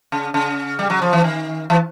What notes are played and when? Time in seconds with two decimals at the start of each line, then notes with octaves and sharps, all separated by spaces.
0.12 C#3
0.34 C#3
0.79 G3
0.90 F#3
1.02 F3
1.13 E3
1.24 D#3
1.70 E3